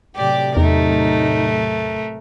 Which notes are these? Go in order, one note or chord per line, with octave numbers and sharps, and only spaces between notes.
A2 C3 F#3 G4 D5
E2 A3 D#4 A#4